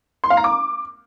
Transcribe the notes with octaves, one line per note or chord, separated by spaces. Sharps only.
C6
F5
A#5
D6